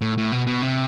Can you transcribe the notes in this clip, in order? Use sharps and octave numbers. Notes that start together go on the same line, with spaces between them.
A2
A2
B2
B2
C3